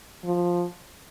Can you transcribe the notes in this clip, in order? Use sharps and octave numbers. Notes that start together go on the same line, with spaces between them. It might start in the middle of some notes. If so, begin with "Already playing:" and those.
F3